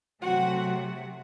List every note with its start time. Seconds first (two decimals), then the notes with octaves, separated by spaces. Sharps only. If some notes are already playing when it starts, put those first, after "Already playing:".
0.21 C3 F#3 A3 C4 F#4 F#5